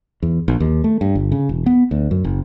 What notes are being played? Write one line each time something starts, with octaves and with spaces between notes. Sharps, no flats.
E2
A#1
D#2
A3
G2
G1
C#3
E1
B3
D2
F#2
F#1